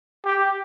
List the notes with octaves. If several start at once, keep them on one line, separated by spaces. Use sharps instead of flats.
G4